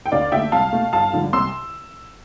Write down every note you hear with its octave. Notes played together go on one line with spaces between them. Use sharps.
G5
D2 D5 F5
D3 A3 E5 G5
C2 F5 A5
B2 A3
G1 F5 A5
G2 D3 F3
C2 C6 E6